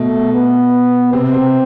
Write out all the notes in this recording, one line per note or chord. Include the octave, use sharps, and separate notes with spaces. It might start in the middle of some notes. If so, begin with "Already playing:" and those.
Already playing: B2 A3
B3
C3 C4
C3